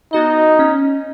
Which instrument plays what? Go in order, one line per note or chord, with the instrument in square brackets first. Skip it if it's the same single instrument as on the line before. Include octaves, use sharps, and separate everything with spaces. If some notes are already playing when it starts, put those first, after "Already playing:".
[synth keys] B3 F#4 D#5 [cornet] D#4
[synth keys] C#4